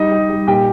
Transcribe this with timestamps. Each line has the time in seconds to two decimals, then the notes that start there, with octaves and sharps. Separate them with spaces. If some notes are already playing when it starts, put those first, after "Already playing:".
Already playing: G3 D#4 D#5
0.12 G3
0.30 G3
0.47 A#2 G4 G5